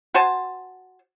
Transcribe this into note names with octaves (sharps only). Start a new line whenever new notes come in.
F#4 C5 G#5 A5